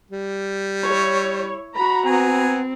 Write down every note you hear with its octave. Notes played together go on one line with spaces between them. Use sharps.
G3
E4 C#5
F#4 A#5 B5
B3 C4 G#5